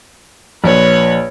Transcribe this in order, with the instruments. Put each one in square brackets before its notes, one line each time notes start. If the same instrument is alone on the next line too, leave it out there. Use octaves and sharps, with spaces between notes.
[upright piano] A#1 [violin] B4 C#5